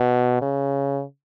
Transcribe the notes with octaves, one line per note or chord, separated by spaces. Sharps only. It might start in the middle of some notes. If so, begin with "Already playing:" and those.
Already playing: B2
C#3